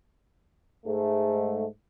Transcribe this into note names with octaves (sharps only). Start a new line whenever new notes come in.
G#2 A3